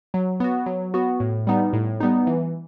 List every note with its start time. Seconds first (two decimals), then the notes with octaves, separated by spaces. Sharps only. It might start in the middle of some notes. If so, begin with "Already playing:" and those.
0.14 F#3
0.40 B3 F#4
0.66 F#3
0.94 B3 F#4
1.20 A2
1.47 G3 B3 D#4
1.73 A2
2.00 G3 B3 D#4
2.27 E3